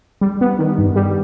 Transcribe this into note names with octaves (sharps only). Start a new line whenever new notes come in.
G3
B3
D#3
G2
G3